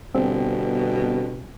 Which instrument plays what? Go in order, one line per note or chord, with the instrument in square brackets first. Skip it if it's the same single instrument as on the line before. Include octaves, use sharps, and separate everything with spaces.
[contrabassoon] G1 [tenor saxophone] B2 [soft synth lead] C4